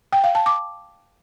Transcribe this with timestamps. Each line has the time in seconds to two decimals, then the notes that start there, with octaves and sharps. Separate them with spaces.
0.13 G5
0.24 F5
0.35 A5
0.46 D6